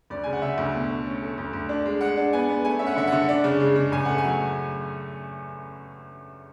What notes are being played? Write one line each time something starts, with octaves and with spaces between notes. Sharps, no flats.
D2 D5
C#3 G#5
F#5
C#3 E5
D2
B2
A3
C#4
A3
D2
D2
D4
G#3
G#3 F#5
D4
B3 G#5
B3
A3 G#5
C#4 E5
F#5
D3 E5
D3 F#5
D4
C#3
G#3
C#3
A1 G#5
A3 F#5
G#5
F#3